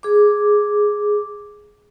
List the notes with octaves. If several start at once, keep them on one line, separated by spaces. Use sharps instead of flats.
G#4 D6